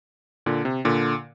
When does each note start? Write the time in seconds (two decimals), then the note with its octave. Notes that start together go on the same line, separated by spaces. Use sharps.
0.46 A#2 D3
0.65 C3
0.85 A#2 D3